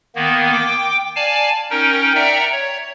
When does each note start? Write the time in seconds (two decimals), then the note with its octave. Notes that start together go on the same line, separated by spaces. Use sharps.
0.15 D#3 A#3 B3
0.52 G5 D6
1.16 D5 F5 G#5 A5
1.70 C#4 D#4 A#4 G5
2.15 D5 E5 F#5 G5 A#5
2.52 C#5